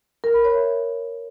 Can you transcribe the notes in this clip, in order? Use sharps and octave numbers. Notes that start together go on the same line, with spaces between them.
A#4
B5
C#5
E5